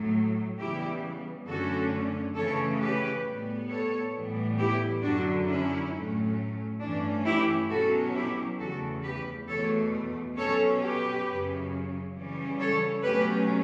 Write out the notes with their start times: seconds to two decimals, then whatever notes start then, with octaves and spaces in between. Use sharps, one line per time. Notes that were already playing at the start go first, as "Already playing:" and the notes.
Already playing: A2 F#3 A3
0.58 C#3 E3 G3 B3 E4 G4
1.47 F#2 D3 A3 C#4 F#4 A4
2.36 C#3 E3 A3 C#4 A4 C#5
2.80 G4 B4
3.25 A2 G3 B3
3.69 A4 C#5
4.14 A2 E3 G3 B3
4.58 E4 G4
5.02 F#2 D3 F#3 D4 F#4
5.47 C#4 E4
5.92 A2 F#3 A3 C#4
6.80 G2 E3 A3 C#4 D4
7.25 E4 G4
7.69 B2 F#3 C#4 F#4 A4
8.15 E4 G4
8.59 E2 C#3 E3 A3 F#4 A4
9.03 G4 B4
9.47 E2 B2 A3 A4 C#5
10.36 B2 F#3 C#4 A4 C#5
10.80 G4 B4
11.26 F#2 C#3 F#3 C#4
12.14 C#3 E3 G3 C#4
12.59 A4 C#5
13.03 B2 F#3 A3 C#4 G4 B4